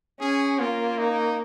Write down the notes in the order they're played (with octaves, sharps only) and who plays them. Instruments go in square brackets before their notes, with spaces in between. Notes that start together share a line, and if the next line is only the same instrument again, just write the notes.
[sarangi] C#4 [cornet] G#4
[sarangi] A#3 [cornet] F4
[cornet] D#4